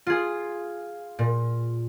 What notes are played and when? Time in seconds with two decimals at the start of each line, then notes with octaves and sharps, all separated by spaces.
0.06 F4 G#4
1.19 A#2